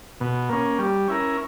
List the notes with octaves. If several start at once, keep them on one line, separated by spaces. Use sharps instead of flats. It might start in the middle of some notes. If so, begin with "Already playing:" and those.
B2
A#3 C#4
G3
C#4 E4 A#4